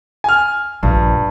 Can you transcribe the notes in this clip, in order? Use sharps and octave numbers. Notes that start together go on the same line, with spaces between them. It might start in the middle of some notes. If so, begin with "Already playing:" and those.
G#5 F6
A#1 G2